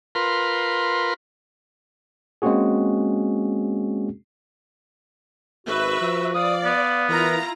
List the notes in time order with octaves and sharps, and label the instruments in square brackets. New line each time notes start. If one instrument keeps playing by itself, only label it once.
[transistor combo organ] F4 A#4 B4 C6
[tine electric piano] G#3 A#3 C4 C#4 F#4 G#4
[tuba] G#1 [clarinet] F#4 [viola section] B4 E5
[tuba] F3
[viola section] D5 [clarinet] F5 [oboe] D#6
[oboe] B3
[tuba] E3 [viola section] E4 F4 A#5 [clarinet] A#4